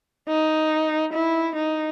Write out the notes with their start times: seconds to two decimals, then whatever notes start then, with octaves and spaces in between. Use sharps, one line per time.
0.28 D#4
1.14 E4
1.56 D#4